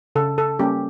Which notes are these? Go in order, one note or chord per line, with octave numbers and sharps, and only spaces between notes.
C#3 A4
A4
G3 A#3 C#4 G4